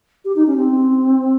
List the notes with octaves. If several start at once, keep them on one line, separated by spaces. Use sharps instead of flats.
G4
D#4
C#4
C4